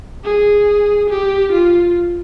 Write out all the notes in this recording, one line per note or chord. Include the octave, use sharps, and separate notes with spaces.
G#4
G4
F4